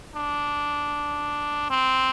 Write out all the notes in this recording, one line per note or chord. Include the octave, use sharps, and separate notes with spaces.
D4
C4